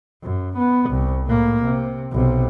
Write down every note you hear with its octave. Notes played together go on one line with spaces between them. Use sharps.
F#2
B3
C2
A2 A#3
C3
B1 C3